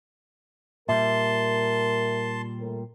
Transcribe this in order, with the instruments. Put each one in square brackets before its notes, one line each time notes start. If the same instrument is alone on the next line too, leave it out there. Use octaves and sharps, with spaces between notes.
[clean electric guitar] A#2 G3 [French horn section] A#4 [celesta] E5 [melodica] A5 C6
[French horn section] A2 A#4 C5